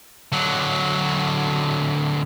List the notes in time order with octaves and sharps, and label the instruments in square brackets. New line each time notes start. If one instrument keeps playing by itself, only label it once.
[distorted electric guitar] D3 F#3